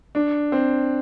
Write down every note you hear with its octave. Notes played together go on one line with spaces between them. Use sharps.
D4
C4